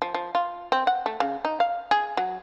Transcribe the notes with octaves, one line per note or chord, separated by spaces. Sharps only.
F3
F3
F4
C4
F#5
A3
C#3
D#4
F5
G#4
F#3